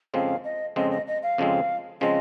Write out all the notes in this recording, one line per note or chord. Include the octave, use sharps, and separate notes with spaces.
F2 C#3 F3 G#3 C4 F5
D#5
F2 C#3 F3 G#3 C4 D#5
D#5
D#5
F5
F2 C#3 F3 G#3 C4
C#3 F3 G#3 C4 D#5